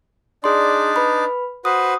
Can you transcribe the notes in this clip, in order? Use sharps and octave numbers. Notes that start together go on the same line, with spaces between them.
D4 D#4 G#4 D5 C6
B4 B5
F#4 B4 C5 D#6